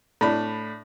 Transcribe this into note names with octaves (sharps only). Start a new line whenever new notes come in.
A2 D4 B5